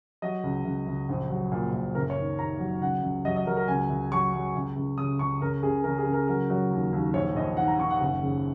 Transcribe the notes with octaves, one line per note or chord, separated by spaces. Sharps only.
F#3 D#5
C#2
C#2
C#2
A#1
F#3
A#2
A#2
F#1 A#4
C#5
D#3
D#3 A#5
F#3
C#2 F#5
C#2
F#3 D#5
D#5
F#3 A#4
A#4
C#2 G#5
C#2
F#3 C#6
F#3
C#2
C#2
C#3 D#6
C#2 C#6
C#3 A#4
C#3 G#4
C#3 A#4
G#4
C#3
A#4
F#3 A#4
F#3
D#2
D#2
A#1 C#5
A#1 D#5
D#3 F#5
A#5
D#3 C#6
F#5
F#1
C#3